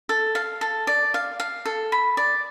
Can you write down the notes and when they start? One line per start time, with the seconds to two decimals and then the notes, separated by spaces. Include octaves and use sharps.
0.09 A4
0.35 F5
0.61 A4
0.87 D5
1.14 F5
1.40 F5
1.66 A4
1.92 B5
2.17 D5